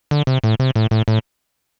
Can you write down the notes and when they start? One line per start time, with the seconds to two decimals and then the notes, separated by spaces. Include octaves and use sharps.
0.11 D3
0.27 C3
0.44 A2
0.60 C3
0.76 A2
0.91 A2
1.08 A2